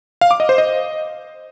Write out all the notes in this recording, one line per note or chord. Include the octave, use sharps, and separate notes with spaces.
F5
D6
D#5
C5
D#5